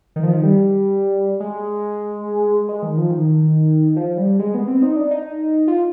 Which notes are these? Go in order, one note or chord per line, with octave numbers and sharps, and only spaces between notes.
D#3
F3
D#3
G3
G#3
G#3
D#3
F3
D#3
F3
G3
G#3
B3
C4
D#4
D4
D#4
F4